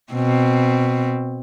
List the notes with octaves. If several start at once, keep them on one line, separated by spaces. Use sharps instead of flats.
B2 C4